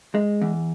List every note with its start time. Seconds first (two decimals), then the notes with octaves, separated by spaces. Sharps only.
0.15 G#3
0.41 E2